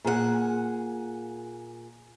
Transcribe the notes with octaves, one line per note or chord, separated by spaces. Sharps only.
A#2 G#4 A4 F#5